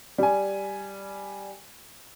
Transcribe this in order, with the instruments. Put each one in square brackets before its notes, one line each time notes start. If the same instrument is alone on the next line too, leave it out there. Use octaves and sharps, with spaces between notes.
[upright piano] G3 G#5